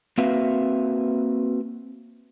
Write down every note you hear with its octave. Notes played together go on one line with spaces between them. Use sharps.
A#3 C4 F#4 B4 E5 F5